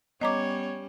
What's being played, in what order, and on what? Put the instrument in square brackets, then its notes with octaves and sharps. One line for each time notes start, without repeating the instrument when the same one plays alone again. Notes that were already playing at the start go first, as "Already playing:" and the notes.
[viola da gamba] G3 C#4 [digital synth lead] B3 [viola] C#5 [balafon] D#5 A#5 D6